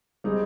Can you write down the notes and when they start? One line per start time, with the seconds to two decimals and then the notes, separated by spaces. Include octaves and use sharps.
0.24 G3 C4 D#4 G#4